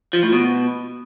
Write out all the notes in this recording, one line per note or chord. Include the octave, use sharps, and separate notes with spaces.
F3
A2
B2